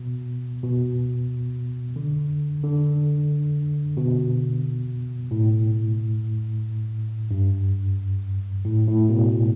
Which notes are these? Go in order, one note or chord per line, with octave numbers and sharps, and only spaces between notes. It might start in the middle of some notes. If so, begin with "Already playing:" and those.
Already playing: B2
B2
D3
D3
B2
A2
G2
A2
A2
B2